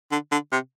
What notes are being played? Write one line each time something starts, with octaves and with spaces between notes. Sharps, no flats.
D3
D3
C3